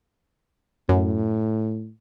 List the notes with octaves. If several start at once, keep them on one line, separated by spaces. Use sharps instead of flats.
F#2 A2